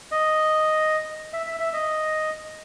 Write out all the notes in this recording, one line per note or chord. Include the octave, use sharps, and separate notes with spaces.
D#5
E5
E5
E5
D#5